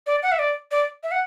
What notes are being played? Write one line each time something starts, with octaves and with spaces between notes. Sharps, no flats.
D5
F#5
E5
D5
D5
E5
F#5